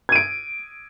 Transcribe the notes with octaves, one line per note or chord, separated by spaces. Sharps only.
G#6 D7 D#7